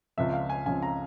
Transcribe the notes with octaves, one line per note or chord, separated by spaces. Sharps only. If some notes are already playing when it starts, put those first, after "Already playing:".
C#2 C#3 F3 C4 E5
F5
G#5
C#2 C#3 F3 C4 G#5
A#5